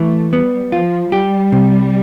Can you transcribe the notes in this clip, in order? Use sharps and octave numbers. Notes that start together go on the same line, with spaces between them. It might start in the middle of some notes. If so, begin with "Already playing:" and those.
Already playing: E3 A3
G3 B3
F3 F4
G3 G4
C3